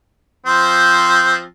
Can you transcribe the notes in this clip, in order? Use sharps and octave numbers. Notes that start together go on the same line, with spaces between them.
F3 C4 C5